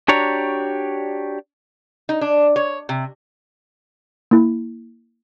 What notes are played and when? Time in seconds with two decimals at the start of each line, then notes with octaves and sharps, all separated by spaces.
0.08 D4 F#4 G4 C#5 D5 A#5
2.09 D#4
2.21 D4
2.56 C#5
2.89 C3
4.31 A#3 E4